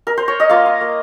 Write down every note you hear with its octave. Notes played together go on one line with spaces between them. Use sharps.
A#4
C5
C#5
D#5
A#3 F4 F5
F4
A#3